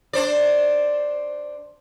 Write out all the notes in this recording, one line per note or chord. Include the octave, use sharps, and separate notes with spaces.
D4 C5 D5